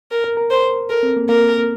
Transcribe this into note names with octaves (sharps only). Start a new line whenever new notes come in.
A#4
A#4
A#4
C5
A4 A#4
C4
A#3
A#3 A#4